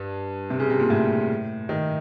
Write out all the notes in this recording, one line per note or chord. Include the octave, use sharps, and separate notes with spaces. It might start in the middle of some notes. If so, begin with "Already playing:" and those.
Already playing: G2
C3
C#3
C3
A#2
A2
D#3